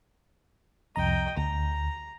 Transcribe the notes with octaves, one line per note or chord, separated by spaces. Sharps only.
C2 F2 D#5 G5 A#5
D2 A#5